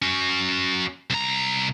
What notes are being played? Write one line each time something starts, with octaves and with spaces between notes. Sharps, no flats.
C#4 F#4
C2 A#5